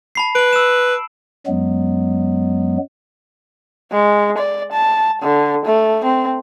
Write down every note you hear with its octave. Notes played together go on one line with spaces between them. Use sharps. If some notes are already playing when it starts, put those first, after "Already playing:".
A5 B5 C7
B4 D7 F#7
E6 E7
F#2 F#3 G#3 B3
G#3
D5
A5
D3
A3
C4